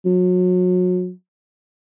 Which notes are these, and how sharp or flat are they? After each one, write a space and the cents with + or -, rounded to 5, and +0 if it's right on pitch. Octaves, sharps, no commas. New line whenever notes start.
F#3 -30